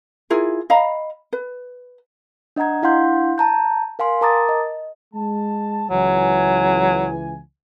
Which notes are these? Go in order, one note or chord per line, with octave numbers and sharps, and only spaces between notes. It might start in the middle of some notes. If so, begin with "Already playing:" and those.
E4 F4 G#4 A#4
D#5 F5 A#5 B5
B4
D4 D#5 F#5 A#5 G#6
D4 E4 F5 F#5 C6 G6
A5 A#5 G6
A#4 F5 G#5 C6
A#4 A5 A#5 D6 D#6 A6
D#5
G#3 A5
C#2 E3 F#3 G#5